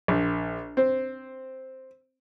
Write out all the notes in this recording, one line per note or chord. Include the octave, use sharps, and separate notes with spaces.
A#1
C4